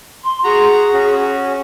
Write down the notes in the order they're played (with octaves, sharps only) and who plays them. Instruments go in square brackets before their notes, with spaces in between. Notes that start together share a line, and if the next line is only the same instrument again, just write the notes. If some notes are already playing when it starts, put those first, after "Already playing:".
[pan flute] C6
[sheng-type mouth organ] F#4 A#5 [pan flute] G#4
[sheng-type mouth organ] C#4 F#4